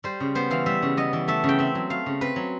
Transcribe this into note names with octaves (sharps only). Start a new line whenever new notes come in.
G3 C5
C#3
B3 C5
E3 F5
G3 E5
C#3
B3 D#5
E3
A3 E5
C#3
G5
C4 E5
F#3
A3 F5
C#3
C4 B4
F#3